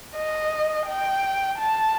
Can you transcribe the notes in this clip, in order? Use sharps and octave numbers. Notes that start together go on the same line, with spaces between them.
D#5
G5
A5